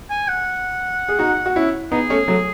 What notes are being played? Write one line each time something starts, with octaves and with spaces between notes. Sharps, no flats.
G#5
F#5
G#4
D#4 F#4
F#4
C#4 E4
B3 D#4 G#4
A3 C#4
F#3 A3